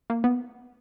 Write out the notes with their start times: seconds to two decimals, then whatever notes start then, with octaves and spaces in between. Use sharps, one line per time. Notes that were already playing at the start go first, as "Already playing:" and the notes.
0.10 A#3
0.24 B3